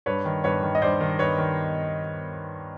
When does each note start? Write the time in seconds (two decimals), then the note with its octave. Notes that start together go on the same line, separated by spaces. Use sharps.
0.06 G2 B4 C#5
0.25 D#3
0.44 G2 B4 C#5
0.63 D#3
0.75 D#5
0.82 G2 C5 D5
1.01 D#3
1.19 G2 B4 C#5
1.38 D#3